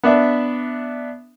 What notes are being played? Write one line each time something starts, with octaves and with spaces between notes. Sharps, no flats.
B3 D4 E5